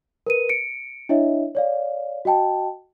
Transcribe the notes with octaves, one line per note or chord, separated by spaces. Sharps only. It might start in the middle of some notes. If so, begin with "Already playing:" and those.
A#4 B4 D#7
C#7 D7
D4 E4 C#5 D#5 E5
C#5 D5 F5
F#4 D#5 G5 A5